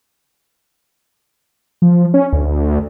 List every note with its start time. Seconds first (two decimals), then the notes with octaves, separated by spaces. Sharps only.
1.82 F3
2.14 C#4
2.33 D2